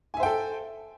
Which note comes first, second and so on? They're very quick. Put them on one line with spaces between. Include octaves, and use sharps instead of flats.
G#5 E5 C5 G5 A4